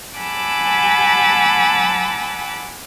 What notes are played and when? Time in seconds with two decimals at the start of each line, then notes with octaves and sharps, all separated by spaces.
0.17 F#5 G#5 A5 B5 D6 E6